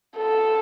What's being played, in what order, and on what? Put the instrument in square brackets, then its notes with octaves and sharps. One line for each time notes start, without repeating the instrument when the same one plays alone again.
[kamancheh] A4